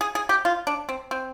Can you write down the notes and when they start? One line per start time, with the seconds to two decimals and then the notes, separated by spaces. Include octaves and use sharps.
0.01 G#4
0.15 G#4
0.29 G4
0.45 F4
0.67 D4
0.89 C4
1.11 C4